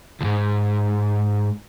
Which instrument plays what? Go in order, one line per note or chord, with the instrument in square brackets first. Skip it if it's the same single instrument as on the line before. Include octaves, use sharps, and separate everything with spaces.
[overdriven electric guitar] D2 G#2